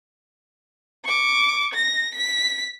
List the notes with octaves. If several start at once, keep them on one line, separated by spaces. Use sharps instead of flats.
C#6 D6
A#6
B6